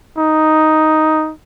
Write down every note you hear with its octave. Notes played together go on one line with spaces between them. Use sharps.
D#4